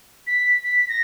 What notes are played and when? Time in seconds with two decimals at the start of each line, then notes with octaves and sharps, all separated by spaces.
0.27 B6
0.64 B6
0.88 A#6